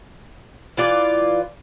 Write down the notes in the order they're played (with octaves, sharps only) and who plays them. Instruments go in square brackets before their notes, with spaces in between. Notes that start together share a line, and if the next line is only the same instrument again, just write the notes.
[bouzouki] E3 F4 D5